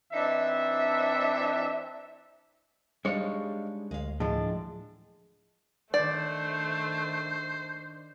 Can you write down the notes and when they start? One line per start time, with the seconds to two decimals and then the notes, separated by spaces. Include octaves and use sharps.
0.12 E3 C4 D4 D#4 E5
3.05 G3 G#3 D4 D#4 C#5 D#5 F5
3.91 D2 G#3 F5
4.20 A2 F3 G#3 D4 F4
5.94 D#3 A3 D4 C5 D5